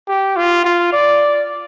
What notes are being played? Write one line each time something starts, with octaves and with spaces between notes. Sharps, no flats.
G4
F4
F4
D5